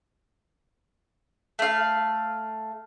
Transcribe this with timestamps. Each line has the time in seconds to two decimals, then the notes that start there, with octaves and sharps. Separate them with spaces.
1.59 A3 F5